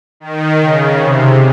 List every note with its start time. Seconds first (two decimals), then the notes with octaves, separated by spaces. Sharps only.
0.20 D#3
0.60 C#3
1.00 C3